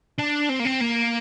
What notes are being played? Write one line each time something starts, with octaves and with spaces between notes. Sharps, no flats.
D4
C4
A#3
C4
A#3